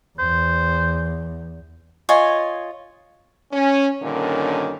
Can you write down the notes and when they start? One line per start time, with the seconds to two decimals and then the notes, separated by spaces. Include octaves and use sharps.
0.19 E2 C5
2.09 F4 C#5 D#5 G#5
3.53 C#4
4.02 G2 A#2 D3 D#3 C#4